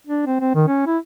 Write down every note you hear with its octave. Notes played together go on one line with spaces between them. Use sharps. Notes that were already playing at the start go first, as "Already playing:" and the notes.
D4
C4
C4
D#3
C#4
E4